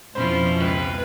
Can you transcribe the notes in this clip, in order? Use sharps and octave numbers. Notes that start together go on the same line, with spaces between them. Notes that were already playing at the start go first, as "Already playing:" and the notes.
F2 B2 F3 C#4 E4 F4 C5 B5
C#2 B4